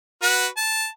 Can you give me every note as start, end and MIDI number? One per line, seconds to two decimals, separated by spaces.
0.22 0.47 66
0.22 0.47 71
0.57 0.86 81